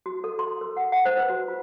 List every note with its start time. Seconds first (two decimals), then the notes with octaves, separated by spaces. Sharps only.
0.06 F#4
0.24 A4
0.39 C6
0.61 A#4
0.77 F#5
0.92 F#5
1.05 C5
1.18 B4
1.30 F#4
1.48 F4